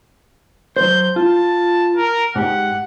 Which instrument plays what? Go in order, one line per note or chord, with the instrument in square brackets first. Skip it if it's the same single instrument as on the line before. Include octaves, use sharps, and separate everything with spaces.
[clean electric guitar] F#3 C5 [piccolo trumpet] G6
[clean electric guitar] F4 [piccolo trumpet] A5
[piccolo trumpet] A#4
[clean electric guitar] G#2 G4 [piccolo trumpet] F#5